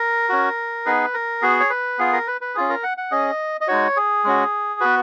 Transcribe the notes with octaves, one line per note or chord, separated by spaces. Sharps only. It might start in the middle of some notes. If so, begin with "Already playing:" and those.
Already playing: A#4
C#4 F#4
B3 D#4 G#4 B4
A#4
B3 F#4 G#4
C#5
B4
B3 F4 G#4
A#4
B4
B4
C#4 F4 G#4
A#4
F#5
F#5
C#4 G#4 D#5
D#5
G#3 D#4 F#4 C#5
G#4
G#3 C#4 F#4
B3 F#4 B4